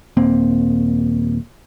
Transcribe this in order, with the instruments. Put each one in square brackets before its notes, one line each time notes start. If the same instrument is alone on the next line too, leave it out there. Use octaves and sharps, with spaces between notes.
[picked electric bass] D#1 A#3 C4